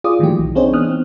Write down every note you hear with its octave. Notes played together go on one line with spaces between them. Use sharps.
F4 G#4 D5 D6 D#6
A2 D#3 E3 F#3 A#3 G4
B1
C4 D4 D#4 G#4 C5 C#5
E3 B3 D#6 F6 F#6
C4